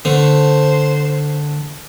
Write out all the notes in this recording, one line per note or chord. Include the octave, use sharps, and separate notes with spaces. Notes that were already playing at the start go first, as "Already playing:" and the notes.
D3 A3 C5